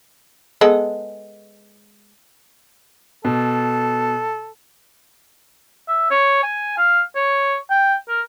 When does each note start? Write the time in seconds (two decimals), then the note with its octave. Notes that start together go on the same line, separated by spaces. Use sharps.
0.61 G#3 B3 A4
3.25 B2 A4
5.88 E5
6.10 C#5
6.43 G#5
6.78 F5
7.15 C#5
7.70 G5
8.08 A#4